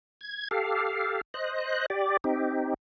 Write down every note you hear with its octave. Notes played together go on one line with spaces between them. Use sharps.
G#6
G4 A4 F5
C5 D#5 F#6
G4 D5
C4 D#4 G4